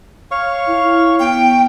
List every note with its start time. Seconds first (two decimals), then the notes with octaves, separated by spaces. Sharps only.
0.31 C#5 F5 C#6
0.67 E4
1.20 B3 G5